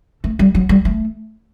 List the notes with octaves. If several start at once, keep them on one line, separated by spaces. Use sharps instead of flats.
A3
G3
F#3
G3
A3